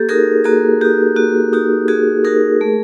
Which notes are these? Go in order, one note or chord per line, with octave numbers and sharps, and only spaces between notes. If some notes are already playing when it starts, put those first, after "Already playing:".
Already playing: A#3 G4 A4
D#4 F#4 G#4 A#4
A#3 F#4 G#4
D#4 F#4 G4
A#3 F#4
D#4 F#4 G4
A#3 F#4 G#4
D#4 F#4 G#4 A#4
A3